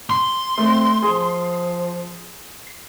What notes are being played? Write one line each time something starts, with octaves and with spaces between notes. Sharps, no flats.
C6
A3 C4
F3 G#4